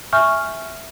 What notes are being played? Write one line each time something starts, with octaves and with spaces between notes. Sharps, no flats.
E5 G#5 C#6 F6 G6